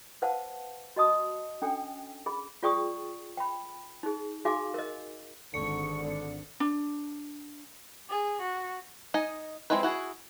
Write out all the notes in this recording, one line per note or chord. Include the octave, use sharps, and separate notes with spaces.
B4 C5 F5 F#5 A5
F#4 D#5 A5 D#6
C#4 D4 A4 G5 G#5
G#4 B5
F4 G#4 D5 G5 C#6 D#6
G5 B5
D#4 G#4
D#4 F#4 G#4 F5 G#5 D6
A#4 D#5
G#1 D3 C#6 C#7
D4
D4
G#4
F#4
D#4 D#5 G#5
F3 G#3 C4 E4 B4
E4 F#4 G#4